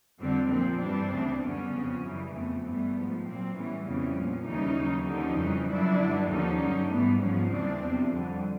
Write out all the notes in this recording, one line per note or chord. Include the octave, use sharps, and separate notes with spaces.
F2 D3 G3 C4 D4
A#2 F3 A#3 C4
G2 E3 G3 C4 D4
D2 C#3 E3
F#2 D3 G3 B3 C#4
F2 C#3 F3
F#2 C#3 E3 G3
F2 C#3 F3 A3 B3
G2 E3 G3 A3 B3
G#2 F3
A#2 F#3 A#3 C4
A2 E3 G3 B3 C#4
F2 C#3 E3 G3 B3 C#4
A#2 F3
D#2 C#3 E3 G3 C#4 D#4
D#2 C#3 F#3
D#2 D3 F3 C#4 D#4
F2 C#3 E3 G3
F#2 C#3 F3 D4 E4
G2 D3 F#3
D#2 D3 F3 C#4 D#4
G2 D3 F#3
G#2 E3 G3 A3 B3
G#2 F3 B3 C#4
D#2 C#3 E3 G3 C4 D4
E2 C3 F3
F2 D3 G3